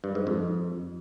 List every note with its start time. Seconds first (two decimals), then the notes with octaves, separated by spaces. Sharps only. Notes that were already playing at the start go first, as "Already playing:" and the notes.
0.04 G2
0.15 G#2
0.27 F2